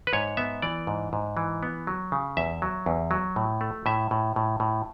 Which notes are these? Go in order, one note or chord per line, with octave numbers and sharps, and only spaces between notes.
B4
G#2 C#5
B3 E5
E3 D5
G#2
G#2
E3
B3
F#3
C#3
E2 E5
F#3
E2
F#3
A2
A3
A2 E5
A2
A2
A2